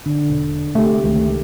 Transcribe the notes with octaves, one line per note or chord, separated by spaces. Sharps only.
D3 D4
E1
C3 A3 G4
C#2 D#3 A3